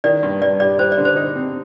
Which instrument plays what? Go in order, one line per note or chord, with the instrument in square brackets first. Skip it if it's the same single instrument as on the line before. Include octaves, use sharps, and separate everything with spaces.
[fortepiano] D#3 [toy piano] D5
[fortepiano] G2
[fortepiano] G2 [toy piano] D5
[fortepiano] G3 [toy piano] D5
[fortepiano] G3 [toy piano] C5
[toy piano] D5
[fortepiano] D3
[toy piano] C5
[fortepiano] D#4
C4